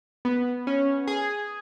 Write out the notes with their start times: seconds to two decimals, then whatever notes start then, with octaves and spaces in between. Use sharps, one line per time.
0.25 B3
0.67 C#4
1.08 G#4